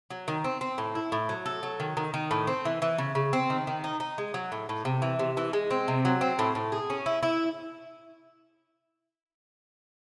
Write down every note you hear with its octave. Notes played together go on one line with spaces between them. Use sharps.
F#3
D#3
C4
C4
A2
E4
A2
F#3
A4
F#3
D#3
D#3
D#3
A2
C4
E3
E3
C#3
C#3
C4
D#3
D#3
D#4
D#4
G#3
F#3
A2
A2
C3
E3
C3
E3
G#3
C4
C3
F#3
C4
A2
A2
G#4
C#4
E4
E4